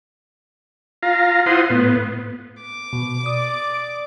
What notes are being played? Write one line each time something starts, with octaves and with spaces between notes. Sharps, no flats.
F4 F5 A#5
E4 F4 C5 F#5 C6 D#6
A2 B3
D6
B2
D5 D#6